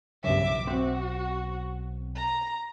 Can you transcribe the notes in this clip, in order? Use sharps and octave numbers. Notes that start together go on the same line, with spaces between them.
B1 E2 G2 C#3 F#3 E5 D6
B1 C4 F#4
A#5